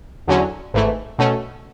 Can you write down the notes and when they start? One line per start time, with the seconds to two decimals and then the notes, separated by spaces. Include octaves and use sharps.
0.28 E2 D3 F#3 C#4
0.74 G#1 G#2 E3 A3
1.19 B2 A3 C#4